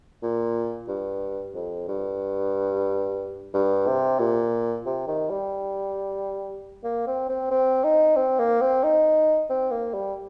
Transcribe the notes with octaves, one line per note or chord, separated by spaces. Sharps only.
A#2
G2
F2
G2
G2
C3
A#2
C3
D#3
G3
A#3
C4
C4
C4
D#4
C4
A#3
C4
D#4
C4
A#3
G3